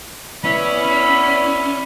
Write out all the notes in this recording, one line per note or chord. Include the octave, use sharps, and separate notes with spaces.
B3 C#4 E4 D5 B5